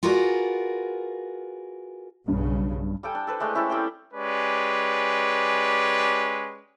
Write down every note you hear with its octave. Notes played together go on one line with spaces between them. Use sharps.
F4 F#4 G#4 A#4 B4 D5
B1 G2 C#3
G3 A4 G5 G#5
D4
A4 B4 C5
G#3 A3 D4
C#4 E4 G4 A4
G3 C4 C5 G5
G#3 C#4 G4 B4 D5